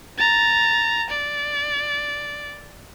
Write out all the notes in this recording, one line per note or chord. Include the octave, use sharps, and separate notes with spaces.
A#5 A6
D5